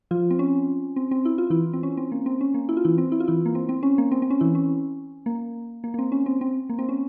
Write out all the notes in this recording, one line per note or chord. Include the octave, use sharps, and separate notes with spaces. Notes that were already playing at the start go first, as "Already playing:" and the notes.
F3 F4
C4
C#4
C4
C4
E4
F4
E3 E4
C4
C#4
C4
A#3
C4
C#4
A#3
E4
F4
E3 E4
C4
E4
F4
E3 E4
A#3
C4
C4
C#4
A#3
C4
C4
C#4
E3 E4
C#4
A#3
A#3
A#3
C4
C#4
C4
C4
A#3
C4
C#4